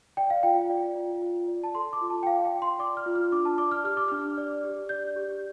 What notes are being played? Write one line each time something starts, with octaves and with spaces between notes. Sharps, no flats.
D5 G5
F5
F4 G5
D5
F4
F4
D5
A5
A4 C6
D6
F4
A5
G5
D5 F5
G5
F4
C6
D5 D6
F6
F4
F6
D4 D6
A5
D5 D6
F6
G4 F6
D6
D4 F6
D5
G4
D5 G6
G4